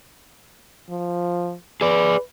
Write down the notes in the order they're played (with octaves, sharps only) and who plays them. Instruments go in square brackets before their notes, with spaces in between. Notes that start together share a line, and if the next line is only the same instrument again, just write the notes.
[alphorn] F3
[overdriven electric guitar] G#4 D5 [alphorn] B4